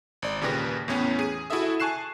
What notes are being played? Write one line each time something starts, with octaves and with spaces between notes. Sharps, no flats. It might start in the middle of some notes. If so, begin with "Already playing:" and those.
G#1 D5
D#2 A#2 C#3 G4 B4 A#6
E2 A2 E3 B3 C#4
G#4 D#7
E4 F#4 G#4 A4 E5 D#6
G#5 A5 C#6 F#6 C7 E7